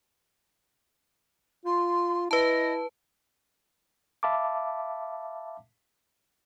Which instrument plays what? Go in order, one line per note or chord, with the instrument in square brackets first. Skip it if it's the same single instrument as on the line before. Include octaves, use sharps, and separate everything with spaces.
[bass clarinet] F4 [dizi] C6
[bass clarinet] E4 [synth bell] B4 A5 [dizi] D#5
[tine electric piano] E5 F5 A5 B5 D6